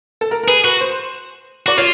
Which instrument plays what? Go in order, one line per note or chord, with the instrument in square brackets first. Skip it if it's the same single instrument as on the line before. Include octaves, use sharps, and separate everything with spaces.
[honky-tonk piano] A4
A#4
A#4
[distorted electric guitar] G#4 [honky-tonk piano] B4
[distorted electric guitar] F#4 [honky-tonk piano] B4
[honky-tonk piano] C5
[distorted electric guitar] F#4 [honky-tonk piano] D5
[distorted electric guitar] F4 [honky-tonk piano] C#5